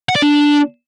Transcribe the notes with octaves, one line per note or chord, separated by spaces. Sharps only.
F#5
D5
D4